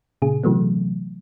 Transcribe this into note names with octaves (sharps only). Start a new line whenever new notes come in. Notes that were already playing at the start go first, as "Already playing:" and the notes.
A#2 C#3 G#4
C3 E3 F#3 A3 B3